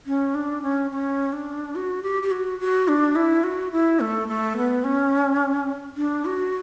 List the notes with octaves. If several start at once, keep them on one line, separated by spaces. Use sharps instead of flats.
C#4
D4
C#4
C#4
D4
F#4
G4
G4
F#4
F#4
D4
E4
F#4
E4
A3
A3
B3
C#4
D4
F#4